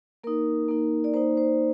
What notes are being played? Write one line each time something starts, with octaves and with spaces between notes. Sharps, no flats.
A#3 D#4 A#4
A#3 D#4
D5
A#3 D#4 C5
C5